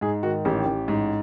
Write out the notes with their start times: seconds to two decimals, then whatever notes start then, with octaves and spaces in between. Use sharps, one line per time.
0.01 G#2 G#4
0.23 D#3 F#4
0.45 A1 G4
0.65 A1
0.88 G#2